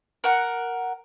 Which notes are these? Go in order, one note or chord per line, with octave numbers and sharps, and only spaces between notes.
A#4 F#5